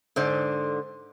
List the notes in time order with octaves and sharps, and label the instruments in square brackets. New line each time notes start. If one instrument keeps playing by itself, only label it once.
[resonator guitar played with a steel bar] G#2 D3 C5 D5